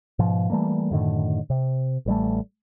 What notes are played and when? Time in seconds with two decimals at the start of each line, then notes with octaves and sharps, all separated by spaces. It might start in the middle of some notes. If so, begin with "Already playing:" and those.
0.19 G#2 B2 F3
0.50 E3 G3 A3 A#3
0.91 F#2 A2 D3 D#3
1.50 C3
2.06 A1 G3 A3